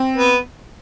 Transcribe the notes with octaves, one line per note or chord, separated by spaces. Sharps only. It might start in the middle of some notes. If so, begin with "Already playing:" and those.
Already playing: C4
B3